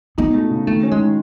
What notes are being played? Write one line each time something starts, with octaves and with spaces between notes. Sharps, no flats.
B3 D#4
A3
C#3
D#3 A3
C#4
G#3
D#3